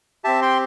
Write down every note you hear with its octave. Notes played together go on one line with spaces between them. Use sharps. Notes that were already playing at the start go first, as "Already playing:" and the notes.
C4 G4 E5 A5
G5 C6